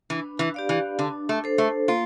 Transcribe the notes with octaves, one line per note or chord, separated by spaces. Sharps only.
E3 D4
E3
G4 D5 F5
E3
D3 D4
A3
A4 C5
A3
A#3 F4